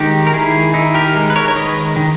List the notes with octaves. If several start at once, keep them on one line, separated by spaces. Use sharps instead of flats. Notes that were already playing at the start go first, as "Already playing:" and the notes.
Already playing: D#3 G#3 D#4 G4
A#4
D#3 E4 G#4
D#4 E4
G4 A#4
G#3
B4
A#4 C#5
C#5
D#3 B4 D#5
D#3